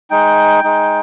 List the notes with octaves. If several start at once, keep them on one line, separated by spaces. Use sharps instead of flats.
G#3 D#4 G5
G#3 D#4